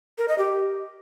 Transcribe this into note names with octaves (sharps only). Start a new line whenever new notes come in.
A#4
D#5
G4